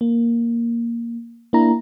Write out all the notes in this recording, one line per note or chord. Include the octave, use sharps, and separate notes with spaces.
A#3
A#3 D4 E4 A#5